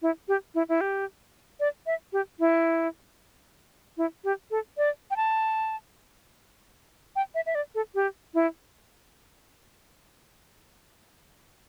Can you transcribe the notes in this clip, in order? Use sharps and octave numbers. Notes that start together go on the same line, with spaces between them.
E4
G4
E4
E4
G4
D5
E5
G4
E4
E4
G4
A4
D5
G5
A5
G5
E5
E5
D5
A4
G4
E4